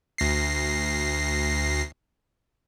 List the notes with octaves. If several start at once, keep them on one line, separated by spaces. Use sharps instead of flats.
D2 A#6 C7